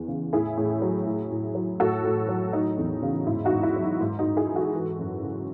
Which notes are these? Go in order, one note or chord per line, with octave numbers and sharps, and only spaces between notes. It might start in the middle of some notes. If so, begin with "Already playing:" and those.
Already playing: E2 E3
C#3
A2 E4 G#4
A2
F#3
A2
A2
F#3
A2 F#4 A4
A2
F#3
F#3 D#4
E2
C#3
G#2 E4
D#4 F#4
G#2
E4
F#3
D#4
G#2
D#4 F#4
G#2
E4 G#4
E3
F#4 A4
E3
F#2
C#3